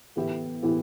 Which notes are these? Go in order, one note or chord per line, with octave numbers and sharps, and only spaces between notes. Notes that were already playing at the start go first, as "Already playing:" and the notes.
A2 E3 B3 E4 G4
A2 E3 B3 E4 G4